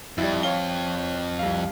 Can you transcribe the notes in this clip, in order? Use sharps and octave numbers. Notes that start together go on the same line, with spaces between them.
F2 G3 E4
C#5 F5 G7
C2 F5